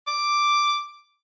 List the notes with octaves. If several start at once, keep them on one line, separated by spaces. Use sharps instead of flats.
D6